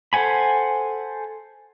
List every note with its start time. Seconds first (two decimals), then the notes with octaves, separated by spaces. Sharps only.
0.13 A4 C5 F#5 G#5 B5